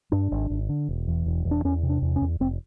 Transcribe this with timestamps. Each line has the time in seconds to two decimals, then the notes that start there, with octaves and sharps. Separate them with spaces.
0.12 G2 D4
0.31 G#1
0.50 G#1
0.69 D3
0.89 E1
1.08 E2
1.26 E1
1.45 E2
1.51 D4
1.64 E2 C#4
1.83 C3
1.89 D4
2.02 E2
2.16 C#4
2.22 E2
2.40 F1 C4